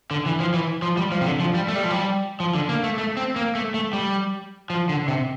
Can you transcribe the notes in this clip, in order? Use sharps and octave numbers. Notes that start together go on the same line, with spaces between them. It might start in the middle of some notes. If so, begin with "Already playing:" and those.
D3
E3
F3
E3
F3
G3
F3
C3
D3
F3
G3
A3
G3
F3
G3
F3
D3
A#3
A3
A3
C4
A#3
A3
A3
G3
F3
D3
C3